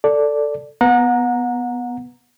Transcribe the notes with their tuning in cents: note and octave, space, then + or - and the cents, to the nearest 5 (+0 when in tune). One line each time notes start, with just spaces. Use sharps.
A4 +10 D5 -5
B3 +0 F#5 -30 A#5 +0